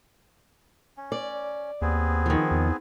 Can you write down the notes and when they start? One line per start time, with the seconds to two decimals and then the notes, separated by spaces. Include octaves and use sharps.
0.97 C#4
1.12 D5
1.81 D#2 B3 C4 G#4
2.26 D#3 F3
2.51 E2